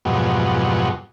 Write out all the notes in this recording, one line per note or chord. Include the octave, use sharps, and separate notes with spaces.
F2 G#2 B2 F#3 G3